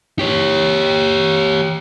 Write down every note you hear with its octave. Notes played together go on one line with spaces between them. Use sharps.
G4 C#5